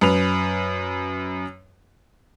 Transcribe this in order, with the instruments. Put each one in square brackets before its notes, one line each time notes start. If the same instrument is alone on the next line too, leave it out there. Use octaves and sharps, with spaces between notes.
[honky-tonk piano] F#2 B4 F7